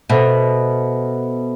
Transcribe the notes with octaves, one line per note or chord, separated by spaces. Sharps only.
B2 A4 C5 E5 B5